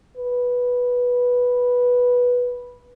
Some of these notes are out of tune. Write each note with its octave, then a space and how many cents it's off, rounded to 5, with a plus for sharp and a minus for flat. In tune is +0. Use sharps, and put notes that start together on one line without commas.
B4 -10